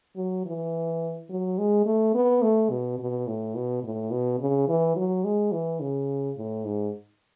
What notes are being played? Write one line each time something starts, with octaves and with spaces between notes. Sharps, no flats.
F#3
E3
F#3
G#3
A3
B3
A3
B2
B2
A2
B2
A2
B2
C#3
E3
F#3
G#3
E3
C#3
A2
G#2